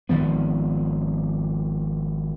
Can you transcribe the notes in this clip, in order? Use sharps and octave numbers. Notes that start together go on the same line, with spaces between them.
G#1 D#3 F3 B3